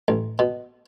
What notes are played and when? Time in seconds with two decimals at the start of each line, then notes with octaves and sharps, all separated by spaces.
0.08 A1
0.39 B2